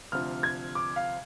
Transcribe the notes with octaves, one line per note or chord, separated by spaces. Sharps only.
D2 C3 F3 F6
G#6
D6
F5